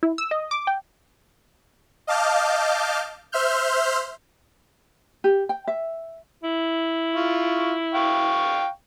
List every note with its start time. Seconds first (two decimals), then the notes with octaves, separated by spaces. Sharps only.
0.03 E4
0.18 E6
0.31 D#5
0.51 D6
0.67 G5
2.07 D#5 F5 A5 D6 F6 G6
3.32 C5 E5 C6 F6 G6
5.24 G4
5.49 G5
5.67 E5
6.43 E4
7.15 F4 C#6
7.94 F5 G5 C#6